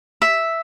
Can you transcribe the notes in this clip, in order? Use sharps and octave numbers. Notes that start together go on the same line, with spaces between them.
E5